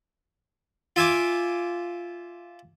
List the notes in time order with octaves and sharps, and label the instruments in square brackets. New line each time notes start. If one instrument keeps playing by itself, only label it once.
[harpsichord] F4 E5 G#5 D6